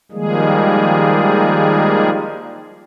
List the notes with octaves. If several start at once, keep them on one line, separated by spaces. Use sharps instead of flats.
D#3 F3 G3 G#3 A#3 G#4